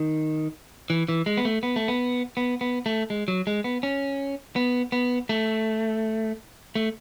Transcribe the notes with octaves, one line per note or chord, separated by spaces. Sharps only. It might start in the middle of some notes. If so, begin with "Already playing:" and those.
Already playing: D#3
E3
E3
G#3
B3
A3
B3
A3
B3
B3
B3
A3
G#3
F#3
G#3
B3
C#4
B3
B3
A3
A3